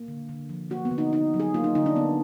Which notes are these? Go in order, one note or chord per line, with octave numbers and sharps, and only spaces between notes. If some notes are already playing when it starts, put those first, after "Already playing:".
Already playing: A#3
D3
D3
F3
A#3 F#4
B3
D3
D#4
D3 D#4
F#3
G#4
A#3 F4
D#4
D3 D#4
D4
D3 B3